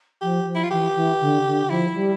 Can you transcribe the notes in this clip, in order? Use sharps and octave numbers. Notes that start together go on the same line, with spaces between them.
F3 G4
F3
E4
F4
E3 G4
E3
D3
D3
F3 E4
G3